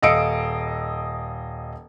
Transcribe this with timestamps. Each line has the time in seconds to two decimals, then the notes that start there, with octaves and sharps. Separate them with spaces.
0.03 D#1 D#5 F5 E6 C#7 D7